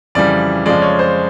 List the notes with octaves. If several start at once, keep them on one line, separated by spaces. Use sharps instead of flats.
F2 C#3 E3 G3 D5
F2 C#3 F3 G#3 D5
C#5
C5